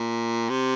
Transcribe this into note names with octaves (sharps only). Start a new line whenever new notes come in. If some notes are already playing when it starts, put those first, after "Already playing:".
Already playing: A#2
C3